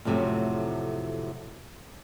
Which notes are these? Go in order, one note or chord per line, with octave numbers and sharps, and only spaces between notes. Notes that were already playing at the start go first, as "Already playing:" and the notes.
F2 A2 C3 F#3 A3